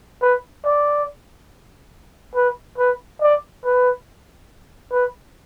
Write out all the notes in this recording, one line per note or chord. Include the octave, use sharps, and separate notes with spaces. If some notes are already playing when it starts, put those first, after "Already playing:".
B4
D5
B4
B4
D5
B4
B4